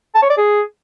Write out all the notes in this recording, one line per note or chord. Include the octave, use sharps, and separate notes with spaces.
A5
C#5
D5
G#4